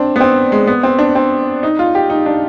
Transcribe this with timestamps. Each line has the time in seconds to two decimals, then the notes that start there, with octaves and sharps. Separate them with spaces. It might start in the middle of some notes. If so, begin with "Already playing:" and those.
Already playing: C4 D4
0.16 B3
0.20 C4
0.52 G#3
0.67 B3
0.83 C4
0.99 D4
1.15 C4
1.63 D#4
1.79 F4
1.95 G4
2.10 D#4
2.26 D4